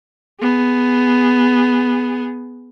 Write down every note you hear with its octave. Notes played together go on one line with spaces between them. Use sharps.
B3 G#4